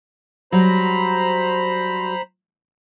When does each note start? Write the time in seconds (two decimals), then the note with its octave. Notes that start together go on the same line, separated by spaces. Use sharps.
0.52 F#3 G3 C5 A#5 B5